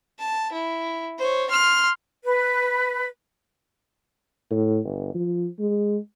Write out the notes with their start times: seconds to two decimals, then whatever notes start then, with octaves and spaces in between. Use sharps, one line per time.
0.19 A5
0.52 E4
1.19 C5 C#5
1.50 C6 F6
2.24 B4
4.51 A2
4.84 G1
5.14 F3
5.59 G#3